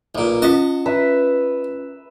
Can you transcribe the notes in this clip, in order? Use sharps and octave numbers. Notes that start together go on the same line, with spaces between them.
B1 A#2
C#4 F4 D#5 A5 C#6
B4 E5